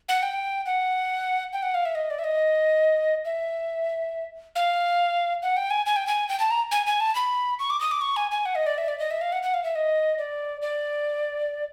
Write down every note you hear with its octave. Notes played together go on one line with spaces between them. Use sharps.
F#5
G5
F#5
G5
F#5
F5
E5
D#5
D5
E5
D#5
E5
F5
F#5
G5
G#5
G#5
G5
G#5
G5
A5
A#5
G#5
G#5
A5
B5
C#6
D6
D#6
D6
C#6
G#5
G#5
F#5
D#5
D5
E5
D5
D#5
E5
F5
F#5
F#5
F5
E5
D#5
D5
D5